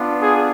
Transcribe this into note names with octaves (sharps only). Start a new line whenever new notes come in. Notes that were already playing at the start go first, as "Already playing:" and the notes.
Already playing: B3 D4 F4
G#4